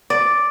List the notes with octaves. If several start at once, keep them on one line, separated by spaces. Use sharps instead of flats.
D5